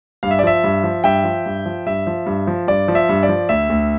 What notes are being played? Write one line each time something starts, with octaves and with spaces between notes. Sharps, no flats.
G2 F5
E5
D5
F3 E5
G2
F3
G2 E5 G5
F3
G2
F3
G2 E5
F3
G2
F3
G2 D5
F3
E5
G2
D5
F3
D2 E5
D2